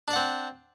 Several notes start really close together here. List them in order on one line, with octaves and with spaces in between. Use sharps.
D4 D5 F#5 C4